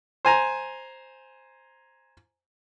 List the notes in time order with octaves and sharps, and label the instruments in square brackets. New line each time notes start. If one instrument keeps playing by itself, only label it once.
[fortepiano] C5 G#5 A#5